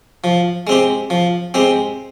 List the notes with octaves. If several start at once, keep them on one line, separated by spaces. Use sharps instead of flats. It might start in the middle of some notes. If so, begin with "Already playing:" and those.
F3
G#3 C4 G4
F3
G#3 C4 G4